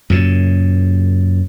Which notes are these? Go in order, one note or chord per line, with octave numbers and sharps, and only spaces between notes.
F#2 A#2 C#3